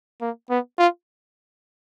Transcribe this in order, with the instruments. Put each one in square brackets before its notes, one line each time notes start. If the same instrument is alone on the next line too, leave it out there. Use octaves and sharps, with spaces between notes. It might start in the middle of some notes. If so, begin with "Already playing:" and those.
[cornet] A#3
B3
F4